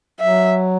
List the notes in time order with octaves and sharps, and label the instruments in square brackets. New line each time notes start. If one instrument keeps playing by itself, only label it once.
[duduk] F#3 [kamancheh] E5